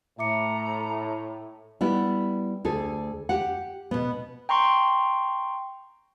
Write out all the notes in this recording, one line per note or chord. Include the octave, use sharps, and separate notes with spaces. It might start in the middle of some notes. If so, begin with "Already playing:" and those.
A2 E5 A#5 D6 C#7
G3 B3 E4
D2 G#4 A4
G4 F#5
B2 B3
G5 A#5 C6 C#6